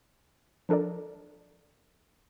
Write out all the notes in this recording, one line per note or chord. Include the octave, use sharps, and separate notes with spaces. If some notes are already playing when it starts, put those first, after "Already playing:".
F3 D4 A4 A#4 D5